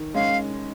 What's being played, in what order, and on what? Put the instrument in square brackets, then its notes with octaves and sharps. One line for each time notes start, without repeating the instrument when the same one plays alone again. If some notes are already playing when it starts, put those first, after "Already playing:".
Already playing: [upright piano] D#3
[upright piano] G#3 C#4 [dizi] F5